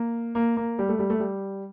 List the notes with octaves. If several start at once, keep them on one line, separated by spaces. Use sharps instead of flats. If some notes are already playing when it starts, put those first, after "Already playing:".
Already playing: A#3
A#3
A#3
G3
A3
G3
A3
G3